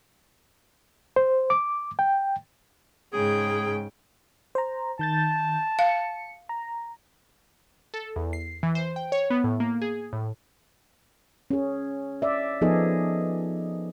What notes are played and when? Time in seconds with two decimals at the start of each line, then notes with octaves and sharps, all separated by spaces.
1.16 C5
1.50 D6
1.99 G5
3.13 G#2 C#3 G#4 G5
4.55 C5 A#5
4.99 D#3 A5 G6 A6
5.79 F5 C#7
6.49 A#5
7.94 A4
8.16 E2
8.33 C7
8.63 E3
8.75 C5
8.96 G5
9.12 C#5
9.30 B3
9.44 A2
9.60 A#3
9.82 G#4
10.13 A2
11.50 C#4 G#4
12.22 D5 E5
12.61 F3 B3 D#4 G#4 A4 D#5